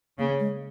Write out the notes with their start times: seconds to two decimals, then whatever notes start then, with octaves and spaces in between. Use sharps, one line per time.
0.18 C#3 A#3
0.40 G#3